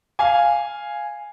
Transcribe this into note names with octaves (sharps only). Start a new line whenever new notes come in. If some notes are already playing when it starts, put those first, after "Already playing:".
F5 G#5